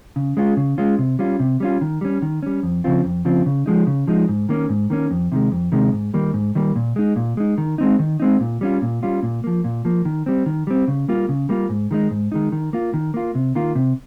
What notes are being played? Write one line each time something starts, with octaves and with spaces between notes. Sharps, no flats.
C#3
G#3 C#4 F4
C#3
G#3 C#4 F4
C3
G3 C#4 F4
C3
G3 C#4 F4
D#3
G3 C#4
D#3
G3 C#4
F2
C#3 F3 C4 F4
F2
C#3 F3 C4 F4
C#3
F3 G#3 D#4
C#3
F3 G#3 D#4
G#2
D#3 A#3 C#4
G#2
D#3 A#3 C#4
F2
C3 D#3 G#3
F2
C3 D#3 G#3
G#2
D#3 G3 A#3
G#2
D#3 G3 A#3
A#2
G#3 D#4
A#2
G#3 D#4
D#3
G#3 C4 D#4
D#3
G#3 C4 D#4
A#2
G3 C#4 F4
A#2
G3 C#4 F4
A#2
F3 A#3
A#2
F3 A#3
D#3
G3 C4
D#3
G3 C4
C#3
G3 A#3 F4
C#3
G3 A#3 F4
G#2
D#3 G#3 D#4
G#2
D#3 G#3 D#4
D#3
A#3 F4
D#3
A#3 F4
C3
D#3 A#3 F4
C3